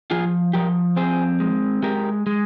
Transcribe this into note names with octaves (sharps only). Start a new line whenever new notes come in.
F3 F4 G#4
F3 G4 A#4
C4 G#4 C5
G#3
G#3 G4 A#4
G#3